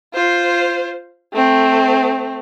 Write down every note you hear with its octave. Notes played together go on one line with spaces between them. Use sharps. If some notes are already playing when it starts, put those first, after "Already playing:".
F4 C5
A3 C4